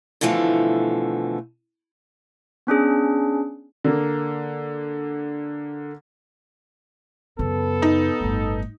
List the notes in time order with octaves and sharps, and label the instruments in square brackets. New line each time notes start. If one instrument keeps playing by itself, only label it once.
[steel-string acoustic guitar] B2 D3 E3 F3 A3
[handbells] B3 C#4 D4 G#4
[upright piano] D3 A#3
[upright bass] F#2 C#3 [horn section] B3 A4
[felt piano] D#4
[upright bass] G1 A2